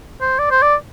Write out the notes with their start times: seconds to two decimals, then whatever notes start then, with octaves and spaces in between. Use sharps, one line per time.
0.21 C5
0.39 D5
0.51 C5
0.63 D5